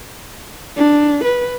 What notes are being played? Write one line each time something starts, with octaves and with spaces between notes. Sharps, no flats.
D4
B4